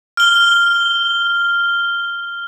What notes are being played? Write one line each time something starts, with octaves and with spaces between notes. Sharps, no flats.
F6 G7